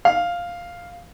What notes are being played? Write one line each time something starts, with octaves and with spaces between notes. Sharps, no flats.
F5